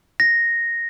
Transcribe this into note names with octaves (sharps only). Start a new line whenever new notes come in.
A#6